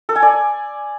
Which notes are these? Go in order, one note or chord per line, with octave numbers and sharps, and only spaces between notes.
A4
G#5
D5